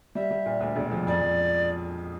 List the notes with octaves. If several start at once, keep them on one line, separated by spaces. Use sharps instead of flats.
G3 E5
G3
A#2
D2
E1
F3
F2 D5
F2